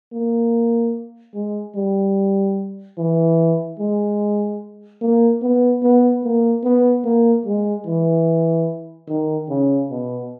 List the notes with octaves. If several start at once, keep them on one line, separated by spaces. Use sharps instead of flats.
A#3
G#3
G3
E3
G#3
A#3
B3
B3
A#3
B3
A#3
G#3
E3
D#3
C#3
B2